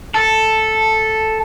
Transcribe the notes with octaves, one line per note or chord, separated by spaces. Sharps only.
A4